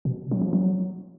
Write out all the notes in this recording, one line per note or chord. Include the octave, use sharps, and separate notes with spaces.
B2
F#3
F3
F#3